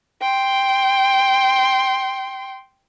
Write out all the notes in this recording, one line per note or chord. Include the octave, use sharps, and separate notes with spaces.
G5 C6